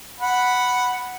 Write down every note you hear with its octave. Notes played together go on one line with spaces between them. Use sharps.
F#5 B5